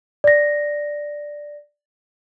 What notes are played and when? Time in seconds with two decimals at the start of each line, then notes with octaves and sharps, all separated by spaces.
0.24 D5 A#6